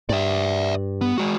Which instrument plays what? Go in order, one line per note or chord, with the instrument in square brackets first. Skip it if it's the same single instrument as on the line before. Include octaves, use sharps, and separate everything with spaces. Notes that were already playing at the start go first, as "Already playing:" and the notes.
[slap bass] G2 [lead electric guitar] D5 E5
[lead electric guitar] B3
G#3 F#4